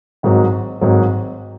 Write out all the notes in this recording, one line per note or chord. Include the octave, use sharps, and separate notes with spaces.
G#1 G#2 F#3
G#1 G#2 F#3